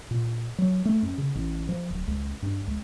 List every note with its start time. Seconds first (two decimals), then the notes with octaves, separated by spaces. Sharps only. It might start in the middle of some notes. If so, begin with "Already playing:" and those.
0.11 A#2
0.58 F#3
0.85 A3
1.03 F#2
1.18 C#3
1.35 A1
1.69 F3
1.90 D1
2.08 C#2
2.42 G2
2.67 C#2